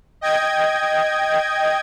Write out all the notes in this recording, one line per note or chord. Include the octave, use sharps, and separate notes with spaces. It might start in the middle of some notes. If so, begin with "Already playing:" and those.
D#5 G5 G#6